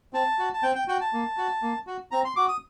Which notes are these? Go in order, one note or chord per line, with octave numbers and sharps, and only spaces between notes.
C4 A5
F#4
A5
C4 G5
G5
F#4 G5
A5
A#3
F#4
A#3
F#4
C4 A#5
C6
F#4 D6
D#6